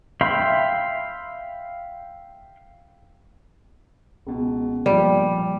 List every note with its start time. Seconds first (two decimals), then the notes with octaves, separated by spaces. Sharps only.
0.21 E5 F5 G5 B5 C6
4.27 C#2 B2
4.86 G2 A#2 F3 G3